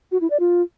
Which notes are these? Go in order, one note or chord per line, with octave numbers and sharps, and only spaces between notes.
F#4
E4
D5
F4